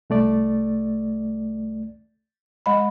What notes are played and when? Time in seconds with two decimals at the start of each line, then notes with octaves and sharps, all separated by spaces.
0.10 C2 A3 D5
2.66 G#3 D#5 B5